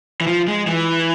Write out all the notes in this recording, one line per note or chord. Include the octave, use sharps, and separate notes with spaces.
E3
F3
G#3
E3